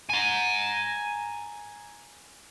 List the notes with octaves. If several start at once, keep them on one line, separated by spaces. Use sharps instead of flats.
G#5 A#5